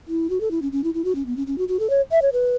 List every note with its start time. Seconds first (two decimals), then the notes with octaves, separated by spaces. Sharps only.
0.08 E4
0.30 F#4
0.41 A4
0.51 E4
0.62 C#4
0.72 C#4
0.84 E4
0.94 E4
1.05 F#4
1.15 C#4
1.26 B3
1.37 C#4
1.47 C#4
1.58 F#4
1.68 F#4
1.79 A4
1.90 C#5
2.12 E5
2.22 C#5
2.33 B4